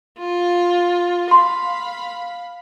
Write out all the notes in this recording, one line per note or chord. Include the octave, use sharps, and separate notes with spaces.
F4
F5 B5 C6